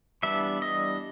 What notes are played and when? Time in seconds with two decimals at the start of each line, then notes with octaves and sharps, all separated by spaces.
0.23 E3 G3 B3 D4 E5
0.62 D#5